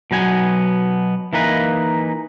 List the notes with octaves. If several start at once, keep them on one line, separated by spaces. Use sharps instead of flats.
B2 F#3 B3 G#5
E3 A#3 D#4 B4